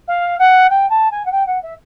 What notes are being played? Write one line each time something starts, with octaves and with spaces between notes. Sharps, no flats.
F5
F#5
G5
A5
G#5
F#5
G5
F#5
E5